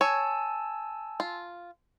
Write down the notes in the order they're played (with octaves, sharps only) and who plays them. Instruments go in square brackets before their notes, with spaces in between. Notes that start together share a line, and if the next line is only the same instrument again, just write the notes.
[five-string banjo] C#5 [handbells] G#5 A5 E6
[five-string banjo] F4